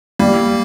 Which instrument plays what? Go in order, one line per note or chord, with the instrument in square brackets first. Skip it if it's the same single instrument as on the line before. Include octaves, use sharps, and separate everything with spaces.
[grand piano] G3 [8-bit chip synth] A#3